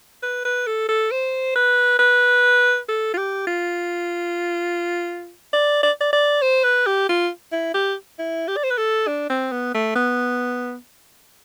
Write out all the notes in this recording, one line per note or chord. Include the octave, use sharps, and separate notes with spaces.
B4
B4
A4
A4
C5
B4
B4
A4
F4
G4
F4
D5
D5
D5
D5
C5
B4
G4
F4
E4
G4
E4
G4
D5
C5
B4
A4
D4
C4
B3
A3
B3